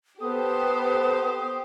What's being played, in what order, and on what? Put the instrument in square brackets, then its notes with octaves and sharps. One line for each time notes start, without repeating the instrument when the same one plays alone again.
[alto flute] B3 [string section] G4 C5 [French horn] A4 [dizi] D#6